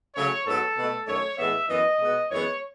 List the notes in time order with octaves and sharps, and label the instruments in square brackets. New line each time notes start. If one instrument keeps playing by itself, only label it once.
[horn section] C#3 F#3 A3 C#5
G#2 F#3 B3 A4
B2 A3
F#2 D#3 A3 C#5
A2 E3 G#3 B3 E5
F#2 E3 B3 D#5
B2 G#3 B3
F#2 E3 G#3 B3 C#5